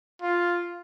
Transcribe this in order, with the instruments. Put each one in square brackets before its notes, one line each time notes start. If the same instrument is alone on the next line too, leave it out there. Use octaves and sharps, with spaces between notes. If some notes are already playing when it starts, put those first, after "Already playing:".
[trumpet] F4